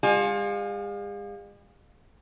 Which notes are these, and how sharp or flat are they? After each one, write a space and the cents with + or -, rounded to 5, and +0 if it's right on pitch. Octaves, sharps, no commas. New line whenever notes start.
G#3 -45 F4 +20 G#5 +0